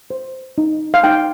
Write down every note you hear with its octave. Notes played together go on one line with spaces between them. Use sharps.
C5
D#4
F5
D#4 G5